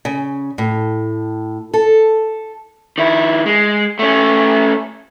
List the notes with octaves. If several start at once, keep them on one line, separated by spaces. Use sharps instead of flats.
C#3
A2
A4
D#3 E4
G#3
A3 C#4